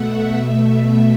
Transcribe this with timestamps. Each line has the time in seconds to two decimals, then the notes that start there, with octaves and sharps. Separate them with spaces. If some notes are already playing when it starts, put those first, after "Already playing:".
Already playing: B2 A3 E5 F#5
0.36 B2 A3